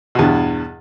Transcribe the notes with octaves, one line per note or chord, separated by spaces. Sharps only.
E2 G2 B2